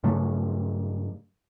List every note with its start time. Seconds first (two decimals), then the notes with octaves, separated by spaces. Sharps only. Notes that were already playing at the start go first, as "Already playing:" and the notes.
0.04 G2 C#3 F#3 A3